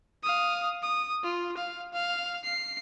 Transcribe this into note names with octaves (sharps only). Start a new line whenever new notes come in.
F5 D#6
D#6
F4
F5
F5
C7